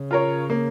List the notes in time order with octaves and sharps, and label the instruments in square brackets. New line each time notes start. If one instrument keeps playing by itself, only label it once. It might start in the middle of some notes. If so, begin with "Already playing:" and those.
Already playing: [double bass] C#3
[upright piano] F4 A#4 C#5
A#3